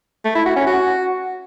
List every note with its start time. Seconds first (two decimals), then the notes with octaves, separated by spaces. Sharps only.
0.25 A3
0.35 E4
0.46 F#4
0.56 C#4
0.67 F#4